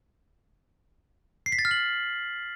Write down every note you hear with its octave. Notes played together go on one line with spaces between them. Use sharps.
C7
B6
A6
F6
F#7